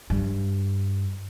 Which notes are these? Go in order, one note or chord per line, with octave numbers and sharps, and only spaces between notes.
G2